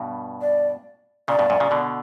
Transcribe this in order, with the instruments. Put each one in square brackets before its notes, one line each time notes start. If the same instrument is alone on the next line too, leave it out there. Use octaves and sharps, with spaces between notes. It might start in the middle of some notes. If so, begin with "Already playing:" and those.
Already playing: [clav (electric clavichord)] G2 B2
[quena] D5
[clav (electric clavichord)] A#2 C#3 [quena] D5
[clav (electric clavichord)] G2 B2
F#2 A#2
A#2 C#3
B2 D3